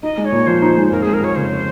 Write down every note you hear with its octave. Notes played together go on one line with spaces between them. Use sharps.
D#4 D#5
G#3
C#5
A#2
F3 C5
D#4
G#3
F2 A#4
G#3 G#4
A#4
F2 C#5
C#3 C5